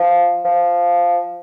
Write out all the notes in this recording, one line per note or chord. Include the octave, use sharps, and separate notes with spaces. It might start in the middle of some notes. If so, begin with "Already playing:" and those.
Already playing: F3
F3